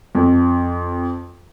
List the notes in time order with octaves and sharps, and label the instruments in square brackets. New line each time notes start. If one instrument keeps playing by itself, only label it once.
[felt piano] F2